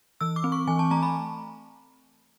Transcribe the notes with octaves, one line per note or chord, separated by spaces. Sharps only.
E3 E6
D6
C4
C#6
E3 G#5
A5
A3 A#5
B5